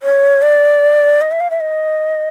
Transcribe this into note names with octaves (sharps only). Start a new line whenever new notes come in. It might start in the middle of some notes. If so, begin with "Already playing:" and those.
C#5
D5
D#5
E5
F5
E5
D#5